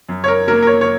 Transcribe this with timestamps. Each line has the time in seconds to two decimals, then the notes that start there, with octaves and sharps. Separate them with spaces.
0.09 F#2
0.24 C#5
0.28 A#4
0.48 F#3 A#3 A#4
0.62 A#4
0.67 C#5
0.81 C#5